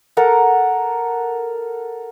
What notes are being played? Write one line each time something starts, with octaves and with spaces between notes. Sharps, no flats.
A4 A#4 F#5